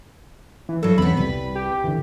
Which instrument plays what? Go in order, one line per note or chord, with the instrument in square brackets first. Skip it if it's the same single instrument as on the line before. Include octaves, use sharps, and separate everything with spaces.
[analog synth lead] E3
[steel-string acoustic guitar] G2 F#3 [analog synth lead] A4
[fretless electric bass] E2 C#4 [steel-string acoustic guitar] C3 B3 [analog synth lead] B5
[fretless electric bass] C2 F3 G3 [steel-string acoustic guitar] B4
[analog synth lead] G4
[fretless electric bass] D3 E3